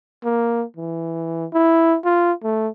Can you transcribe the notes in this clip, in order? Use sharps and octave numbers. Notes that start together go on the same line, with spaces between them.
A#3
E3
E4
F4
A3